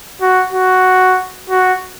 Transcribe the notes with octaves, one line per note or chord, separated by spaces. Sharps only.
F#4
F#4
F#4